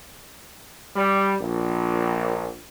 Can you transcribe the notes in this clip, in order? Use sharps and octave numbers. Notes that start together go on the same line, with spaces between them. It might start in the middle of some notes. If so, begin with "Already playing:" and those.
G3
A#1